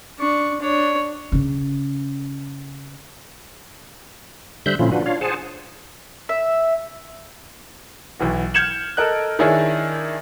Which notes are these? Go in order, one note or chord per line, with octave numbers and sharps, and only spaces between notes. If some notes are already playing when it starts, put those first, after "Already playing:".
D4 C#6
D4 C#5
C#3 C#4
D3 G3 C5 E5 F#6 G6
A#2 D3 F3 C#4 E4 F4
D4 F4 F#4 B4
D4 F4 C#5 F5
G#4 C5 F#5 G#5 A5
E5
B1 E3 F#4
F6 G6 G#6 C#7 E7 F#7
A4 A#4 D#5 F#6
D#3 D4 E4 G#4 C#5